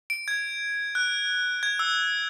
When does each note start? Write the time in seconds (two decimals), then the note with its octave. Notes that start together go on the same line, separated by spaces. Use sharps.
0.10 D7
0.28 G#6
0.95 F#6
1.63 G#6
1.79 E6